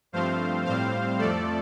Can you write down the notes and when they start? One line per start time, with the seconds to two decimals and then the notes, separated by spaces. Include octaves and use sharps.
0.12 G2 F3 A3 C4 C5 F5
0.65 A2 G3 C4 C5 F5
1.18 F2 F3 A3 A4 D5